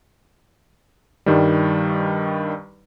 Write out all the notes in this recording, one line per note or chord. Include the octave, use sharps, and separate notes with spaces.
G2 D#3 G3